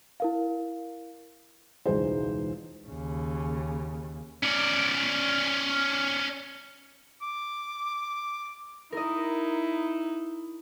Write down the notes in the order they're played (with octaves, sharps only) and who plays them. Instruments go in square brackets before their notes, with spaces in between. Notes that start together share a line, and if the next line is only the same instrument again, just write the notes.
[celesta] E4 A#4 F5
[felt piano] E1 C#2 E3 D#4 G#4 C5
[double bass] D#2 C#3
[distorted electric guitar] C#4 D5
[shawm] D6
[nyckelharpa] D#4 E4 [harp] A#4 D#5